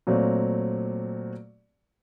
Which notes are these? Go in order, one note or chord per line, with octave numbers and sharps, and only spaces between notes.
A#2 F#3 A3 C4